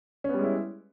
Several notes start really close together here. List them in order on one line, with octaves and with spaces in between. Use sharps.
C#4 B3 G3 G#3 E4